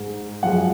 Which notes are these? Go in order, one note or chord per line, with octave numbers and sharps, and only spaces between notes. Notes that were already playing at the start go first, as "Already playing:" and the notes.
Already playing: G#2 G#3
F#2 F3 G#3 F#5